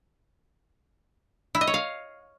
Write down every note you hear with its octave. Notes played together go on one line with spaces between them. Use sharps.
E4
D#5
C#5
F5